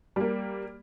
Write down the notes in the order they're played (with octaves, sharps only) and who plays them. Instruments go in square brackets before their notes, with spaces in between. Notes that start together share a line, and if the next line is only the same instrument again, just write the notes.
[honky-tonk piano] G3 A#3